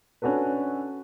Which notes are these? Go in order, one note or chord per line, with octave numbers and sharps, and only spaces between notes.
C#4 D4 F#4 A4 B4